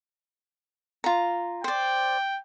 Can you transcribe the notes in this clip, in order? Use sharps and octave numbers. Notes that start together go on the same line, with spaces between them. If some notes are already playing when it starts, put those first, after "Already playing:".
F4 A#5
C5 D5 G5